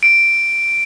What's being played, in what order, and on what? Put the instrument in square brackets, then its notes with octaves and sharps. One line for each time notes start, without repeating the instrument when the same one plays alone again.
[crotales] D7